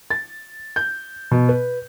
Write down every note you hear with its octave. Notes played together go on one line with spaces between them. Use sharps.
A6
G6
B2
B4